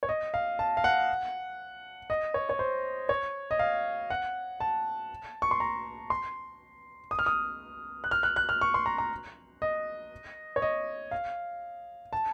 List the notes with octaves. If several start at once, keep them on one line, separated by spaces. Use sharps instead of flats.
C#5
D#5
F5
A5
F5
F#5
D#5
C#5
C#5
C5
C#5
D#5
F5
F#5
A5
C#6
C6
A#5
C6
D#6
F6
D#6
F#6
F6
F#6
F#6
F6
C#6
C6
A#5
A#5
D#5
C#5
D#5
F5
A5